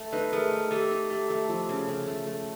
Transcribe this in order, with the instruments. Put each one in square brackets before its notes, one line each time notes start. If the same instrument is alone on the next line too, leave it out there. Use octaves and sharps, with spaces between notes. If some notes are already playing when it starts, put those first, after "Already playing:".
Already playing: [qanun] A3
[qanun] D#4 [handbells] A4 B4
[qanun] A3 [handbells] G#4 A#4
[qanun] A3
[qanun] A3 [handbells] G4 A4
[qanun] D#4
[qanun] A3 [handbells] G4 A4
[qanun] A3
F3
C#3
C#3
A3
A3